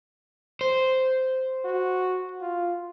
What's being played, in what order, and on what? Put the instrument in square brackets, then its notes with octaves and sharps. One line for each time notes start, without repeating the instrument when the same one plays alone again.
[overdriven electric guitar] C5
[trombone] F#4
F4